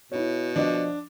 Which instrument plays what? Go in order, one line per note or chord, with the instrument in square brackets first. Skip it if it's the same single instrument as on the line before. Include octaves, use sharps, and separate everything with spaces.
[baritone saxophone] B2 [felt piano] E4 C#5
[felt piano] F3 D5 D#5 [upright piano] D4